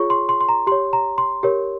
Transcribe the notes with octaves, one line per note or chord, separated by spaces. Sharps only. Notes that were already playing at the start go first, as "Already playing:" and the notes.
Already playing: F4 G#4 C#5 C#6
C6
C6
C6
A#5
G4 C#5 C6
A#5
C6
G4 A#4 C#5